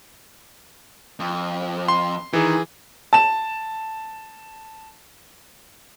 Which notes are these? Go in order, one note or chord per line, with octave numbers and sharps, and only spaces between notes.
F2
C6
D#3 E3 G#4
A5 E7